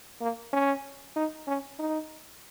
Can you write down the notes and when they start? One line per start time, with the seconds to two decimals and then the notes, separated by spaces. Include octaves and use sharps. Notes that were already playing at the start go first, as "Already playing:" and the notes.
0.21 A#3
0.53 C#4
1.16 D#4
1.47 C#4
1.79 D#4